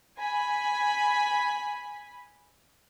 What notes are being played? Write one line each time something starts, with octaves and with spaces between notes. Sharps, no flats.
G#5 B5